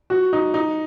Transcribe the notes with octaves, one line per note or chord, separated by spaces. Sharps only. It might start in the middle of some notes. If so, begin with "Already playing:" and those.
F#4
D#4
D#4